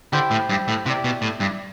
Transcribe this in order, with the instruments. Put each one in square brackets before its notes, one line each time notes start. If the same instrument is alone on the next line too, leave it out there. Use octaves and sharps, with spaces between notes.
[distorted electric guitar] D3 [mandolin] E4 G4 C5 G5
[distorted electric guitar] A2
G2
A2
[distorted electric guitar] C3 [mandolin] E4 G4 D5
[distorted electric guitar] B2
A2
G2